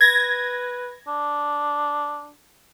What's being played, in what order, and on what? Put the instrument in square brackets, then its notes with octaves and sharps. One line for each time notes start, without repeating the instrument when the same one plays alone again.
[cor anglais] B4 [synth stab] G#6 A#6
[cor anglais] D4